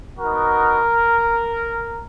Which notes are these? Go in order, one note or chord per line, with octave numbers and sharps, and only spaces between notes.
B3 D#4 F#4 A#4